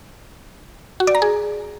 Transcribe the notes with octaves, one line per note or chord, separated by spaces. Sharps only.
F#4
D5
A#5
G#4